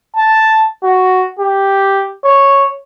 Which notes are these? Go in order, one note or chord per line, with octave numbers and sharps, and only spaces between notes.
A5
F#4
G4
C#5